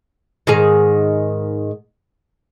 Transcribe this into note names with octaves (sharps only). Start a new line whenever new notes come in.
G#2 D#3 G#4